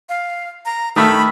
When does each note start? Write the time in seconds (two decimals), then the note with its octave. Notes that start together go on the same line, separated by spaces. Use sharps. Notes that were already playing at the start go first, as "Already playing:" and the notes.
0.09 F5
0.65 A#5
0.96 D#3 A3 B5 E6